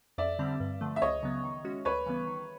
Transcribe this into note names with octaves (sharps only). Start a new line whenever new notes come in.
F2 D5 E5
D3 G3 C4
G2
D3 F3 A3
E5
C#2 C#5 D#5
C#3 F#3 B3
D#3
G#3 C#4 F#4
D2 B4 C#5
C#3 E3 G3 B3
D#3